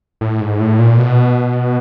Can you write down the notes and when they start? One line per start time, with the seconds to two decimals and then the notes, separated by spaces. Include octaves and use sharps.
0.21 A2
0.41 G#2
0.60 A2
0.79 A#2
0.98 B2